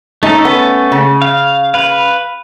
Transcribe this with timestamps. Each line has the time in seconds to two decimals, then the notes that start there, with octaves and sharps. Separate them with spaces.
0.23 A3 C#4 D#4 A4
0.45 B3
0.92 C#3
1.22 F5
1.74 B4 F5